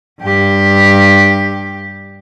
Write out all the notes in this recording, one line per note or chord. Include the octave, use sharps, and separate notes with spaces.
G2 G4